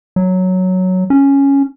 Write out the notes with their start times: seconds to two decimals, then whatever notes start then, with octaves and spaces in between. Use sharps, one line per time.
0.16 F#3
1.10 C#4